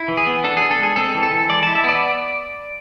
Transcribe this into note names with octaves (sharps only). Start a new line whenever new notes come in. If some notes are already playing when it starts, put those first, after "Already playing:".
Already playing: E4
E3
G#4
B3
D4 A4
G#4
D4
A4
G#3 G#4
C4 A4
E3
A4
E3
G#3 D5
E4 A5
E5
B3 D5